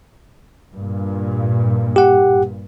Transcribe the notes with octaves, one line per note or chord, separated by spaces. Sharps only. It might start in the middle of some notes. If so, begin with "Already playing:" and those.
G2 A#2
G4 F#5